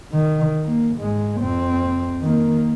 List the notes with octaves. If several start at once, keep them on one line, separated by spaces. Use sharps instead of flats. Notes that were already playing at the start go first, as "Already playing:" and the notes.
D#3
A#3
G#2 G#3
F2 C4
D#3 A#3